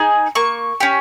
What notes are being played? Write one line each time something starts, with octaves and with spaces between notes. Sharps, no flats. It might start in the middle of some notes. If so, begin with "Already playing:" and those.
Already playing: D#4 G#4
A#3 C#6
C#4 G4